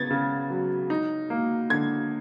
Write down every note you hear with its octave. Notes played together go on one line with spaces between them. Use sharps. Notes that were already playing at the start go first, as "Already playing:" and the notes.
Already playing: C#3 B3 G#6 A6
C#3
F#3
D#4
A#3
D3 G#6